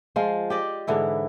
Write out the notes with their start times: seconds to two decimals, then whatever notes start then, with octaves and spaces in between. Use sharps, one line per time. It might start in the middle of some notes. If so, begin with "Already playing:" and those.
0.16 F3 G#3 F4
0.50 G4 D5 D#5
0.87 G#2 D3 E3 E4